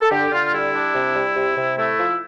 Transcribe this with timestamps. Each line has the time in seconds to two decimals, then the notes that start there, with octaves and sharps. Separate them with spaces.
0.02 A4
0.11 D3 G4
0.32 D3 F4
0.53 G3 E4
0.73 D4
0.95 C3
1.16 G3
1.36 C3
1.57 C3
1.78 A3 E4
1.99 F3